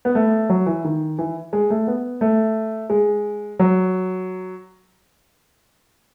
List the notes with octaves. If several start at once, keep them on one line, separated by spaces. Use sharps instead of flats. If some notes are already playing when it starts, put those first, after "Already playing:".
B3
A3
F#3
E3
D#3
E3
G#3
A3
B3
A3
G#3
F#3